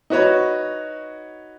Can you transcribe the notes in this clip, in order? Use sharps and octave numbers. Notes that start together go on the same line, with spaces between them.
D#4 F#4 B4 C#5